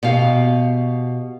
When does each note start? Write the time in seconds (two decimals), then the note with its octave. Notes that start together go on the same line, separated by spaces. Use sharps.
0.03 B2 G4 F5